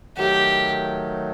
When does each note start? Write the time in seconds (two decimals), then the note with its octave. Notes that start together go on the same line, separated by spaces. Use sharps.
0.17 D#3 F#3 A3 G4